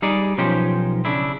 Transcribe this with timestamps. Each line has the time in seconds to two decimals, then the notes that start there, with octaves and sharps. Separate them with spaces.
0.02 G3 D#4 G#4 D5
0.38 B1 F3 C#4 D#4 G4 C5
1.05 C#3 D4 E4